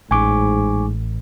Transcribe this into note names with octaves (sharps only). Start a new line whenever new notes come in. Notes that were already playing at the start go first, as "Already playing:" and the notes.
A1 G#2 G#5 C#6 D6